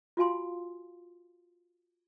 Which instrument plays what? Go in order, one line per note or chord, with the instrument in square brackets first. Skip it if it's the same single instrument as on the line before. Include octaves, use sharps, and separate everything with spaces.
[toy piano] F4 F#4 F5 G#5 C6